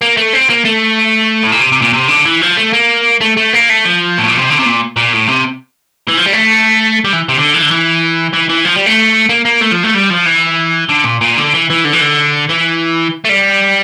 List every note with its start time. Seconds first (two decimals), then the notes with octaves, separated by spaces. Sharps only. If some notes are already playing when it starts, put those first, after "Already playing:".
0.02 A#3
0.17 A3
0.33 C4
0.50 A#3
0.65 A3
1.43 A2
1.52 A#2
1.61 C3
1.72 C3
1.82 A#2
1.93 C3
2.08 D3
2.26 E3
2.42 F3
2.57 A3
2.73 A#3
3.21 A3
3.37 A3
3.53 A#3
3.69 A3
3.85 F3
4.18 A2
4.28 A#2
4.38 C3
4.49 D3
4.59 C3
4.66 A#2
4.97 A#2
5.13 A2
5.29 C3
6.09 E3
6.17 F3
6.26 G3
6.33 A3
7.05 G3
7.13 E3
7.29 C3
7.38 D3
7.54 E3
7.62 D3
7.71 E3
8.33 E3
8.49 E3
8.65 F3
8.76 G3
8.86 A3
9.29 A#3
9.45 A#3
9.61 A3
9.71 F3
9.83 A3
9.94 G3
10.10 F3
10.25 E3
10.90 D3
11.05 A#2
11.21 A#2
11.37 D3
11.54 E3
11.70 E3
11.85 D3
11.93 E3
12.01 D3
12.49 E3
13.25 A3
13.29 G3